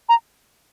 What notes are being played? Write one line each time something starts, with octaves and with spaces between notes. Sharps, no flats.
A#5